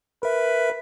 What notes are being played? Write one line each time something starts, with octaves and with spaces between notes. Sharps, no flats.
A#4 B4 E5